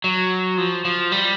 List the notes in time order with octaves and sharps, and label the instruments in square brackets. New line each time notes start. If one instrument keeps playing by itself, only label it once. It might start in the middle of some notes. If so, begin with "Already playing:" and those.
[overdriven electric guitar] F#3
F3
F3
G3